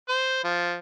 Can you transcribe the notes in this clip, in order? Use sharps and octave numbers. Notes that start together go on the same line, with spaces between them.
C5
F3